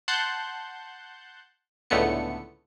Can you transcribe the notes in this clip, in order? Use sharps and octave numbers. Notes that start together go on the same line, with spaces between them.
F#5 A5 C6 F#6 G6
C#2 A2 D3 A3 B3 C#7